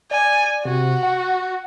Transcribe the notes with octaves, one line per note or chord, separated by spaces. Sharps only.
D5 G#5
C3 F#4
F#5